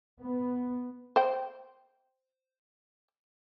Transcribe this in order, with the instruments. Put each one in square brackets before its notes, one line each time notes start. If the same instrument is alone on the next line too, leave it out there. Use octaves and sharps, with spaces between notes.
[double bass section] B3
[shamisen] C5 G5